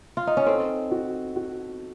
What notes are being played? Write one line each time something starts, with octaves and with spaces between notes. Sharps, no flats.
F4
D#4
C#4
C4 A4
F#4
F#4